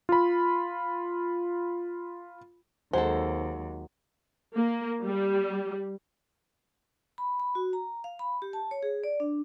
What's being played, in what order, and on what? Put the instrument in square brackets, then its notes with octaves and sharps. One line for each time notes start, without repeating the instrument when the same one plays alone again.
[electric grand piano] F4 B5
[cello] D#2 [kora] F#3 G#3 [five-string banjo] A4 C5
[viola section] A#3
G3
[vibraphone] B5
B5
F#4
A#5
F5
B5
G4
A5
C#5
G#4
D5
D4